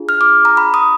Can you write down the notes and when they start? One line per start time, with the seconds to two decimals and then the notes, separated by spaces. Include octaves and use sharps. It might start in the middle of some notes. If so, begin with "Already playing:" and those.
Already playing: D4 F4 G#4
0.09 F6
0.21 D6
0.45 A#5
0.57 B5
0.74 D#6